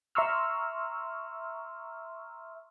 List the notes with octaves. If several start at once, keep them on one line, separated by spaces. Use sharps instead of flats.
E5 A#5 C6 C#6 E6 F6